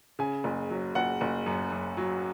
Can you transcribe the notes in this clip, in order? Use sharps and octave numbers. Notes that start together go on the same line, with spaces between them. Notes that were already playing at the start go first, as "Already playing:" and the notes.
C#3 G#5
F#1
F#3
F#1 F#5
F#1
F#2
F#2
F#3